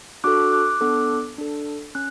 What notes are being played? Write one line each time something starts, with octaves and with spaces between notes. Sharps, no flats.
D4 F#4 A4 D6 F#6
D6 F#6
B3 D4 A4 D6 F#6
D4 A4
C#4 F#6